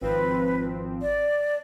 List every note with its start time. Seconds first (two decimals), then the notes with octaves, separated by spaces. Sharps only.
0.01 G#1 F3 C4 B4
1.02 D5